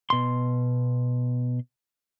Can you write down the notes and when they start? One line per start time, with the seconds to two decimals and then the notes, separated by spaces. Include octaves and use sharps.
0.10 B2 C6